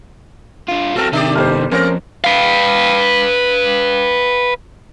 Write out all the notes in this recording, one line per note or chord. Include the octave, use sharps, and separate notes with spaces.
D3 F4
F#3 C4 A4 A#4
C3 D#3 D4 G4 D5 E5
G1 F2 G3 A#4 C5 F6
F2 G#3 A#3 C#4 A#4 C5
B4 F5